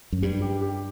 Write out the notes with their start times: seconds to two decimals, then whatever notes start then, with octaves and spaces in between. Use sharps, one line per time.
0.12 F#2
0.22 G2 G3
0.42 G4
0.61 G4